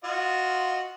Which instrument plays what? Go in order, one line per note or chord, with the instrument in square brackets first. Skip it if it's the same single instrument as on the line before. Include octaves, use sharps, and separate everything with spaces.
[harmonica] F4 F#4 D#5